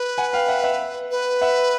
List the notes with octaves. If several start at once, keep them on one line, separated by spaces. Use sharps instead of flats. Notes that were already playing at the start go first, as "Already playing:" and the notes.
Already playing: B4
F#5 G#5
F5 G5
E5 F#5
E5 F#5
B4
E5 F#5